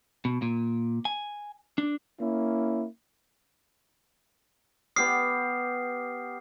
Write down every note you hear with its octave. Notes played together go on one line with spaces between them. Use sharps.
B2
A#2
G#5
D4
A#3 C#4 E4
B3 G4 D5 D#6 F6 C7